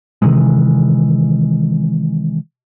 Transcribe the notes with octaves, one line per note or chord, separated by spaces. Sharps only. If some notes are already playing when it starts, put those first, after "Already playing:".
C3 D#3 E3 G#3